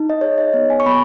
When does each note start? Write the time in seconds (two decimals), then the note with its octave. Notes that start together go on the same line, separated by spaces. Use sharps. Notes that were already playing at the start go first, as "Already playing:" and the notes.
Already playing: D#4
0.10 D#5
0.21 G#4 C#5
0.38 D#5
0.53 B3 C#5
0.70 G#5
0.80 C#6
0.86 B3 B5